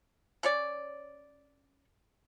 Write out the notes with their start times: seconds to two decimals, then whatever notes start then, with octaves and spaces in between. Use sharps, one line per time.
0.43 C#4 C#5 D5